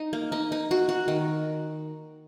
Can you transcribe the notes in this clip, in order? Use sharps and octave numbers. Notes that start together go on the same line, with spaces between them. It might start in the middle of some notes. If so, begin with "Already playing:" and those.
Already playing: D#4
A#3
D#4
D#4
F#4
F#4
D#3